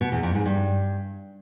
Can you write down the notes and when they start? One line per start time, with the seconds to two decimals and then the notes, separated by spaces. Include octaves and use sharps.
0.01 B2
0.12 E2
0.23 F2
0.34 G#2
0.45 G2